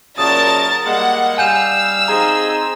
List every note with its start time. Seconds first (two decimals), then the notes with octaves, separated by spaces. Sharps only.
0.18 F#2 A#2 C#3 A#4 A5 D#6 A6
0.85 G3 G#3 A#3 F#5
1.38 G3 F5 G#5 E6 G6 E7
2.08 C4 D#4 G#4 A#5